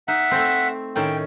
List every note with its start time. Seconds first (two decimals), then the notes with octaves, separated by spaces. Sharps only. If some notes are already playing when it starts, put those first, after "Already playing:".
0.08 D#4 E5 F#5
0.31 A3 C4
0.96 A2 D#3 C#4 G5